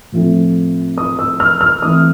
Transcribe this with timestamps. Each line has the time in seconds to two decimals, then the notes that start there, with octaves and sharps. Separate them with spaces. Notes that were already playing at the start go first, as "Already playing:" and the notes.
0.12 A2 F3 A3 C4
0.98 D#6
1.19 E6
1.40 F6
1.61 F6
1.82 E3 A3 C4 D#6